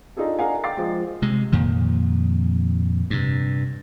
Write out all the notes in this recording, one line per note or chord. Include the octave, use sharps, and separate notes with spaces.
D4 D#4 F4 G#4 A4
D4 G#4 A#4 F5 F#5 G#5
F5 G5 D6 A6 C7
F3 G#3
C3 G#3
F2 A#2 D#3
G2 C3